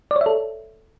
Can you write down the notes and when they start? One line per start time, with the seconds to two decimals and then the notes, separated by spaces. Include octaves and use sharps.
0.11 D5
0.16 C#5
0.21 E5
0.26 A4